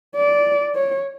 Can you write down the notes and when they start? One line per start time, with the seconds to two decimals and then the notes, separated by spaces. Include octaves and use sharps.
0.16 D5
0.75 C#5